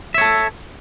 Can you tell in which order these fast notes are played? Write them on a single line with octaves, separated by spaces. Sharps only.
E5 C#5 A4